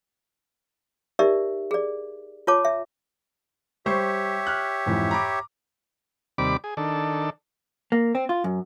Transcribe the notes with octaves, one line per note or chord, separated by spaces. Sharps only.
D#4 G4 A#4 D5 E5
G#4 D5
F4 C#5 A5 D6
E5
G3 G4 C5 C#5 E5 C#6
F6 F#6
F2 G#2 E3
A#5 B5 D6
D#2 C3 G3 D5 B5 D6
G#4
D#3 D4 A4
A#3
C4
F4
F#2